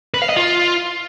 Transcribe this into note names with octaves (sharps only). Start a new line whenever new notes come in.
B4
F5
D#5
F4